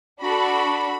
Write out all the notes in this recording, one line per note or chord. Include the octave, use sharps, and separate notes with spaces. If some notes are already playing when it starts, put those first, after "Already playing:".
D4 F#4 A4 B5